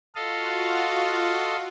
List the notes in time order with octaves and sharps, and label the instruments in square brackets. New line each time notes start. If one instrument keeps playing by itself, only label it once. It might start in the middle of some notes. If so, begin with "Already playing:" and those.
[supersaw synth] F4 F#4 [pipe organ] A4 D#5 F5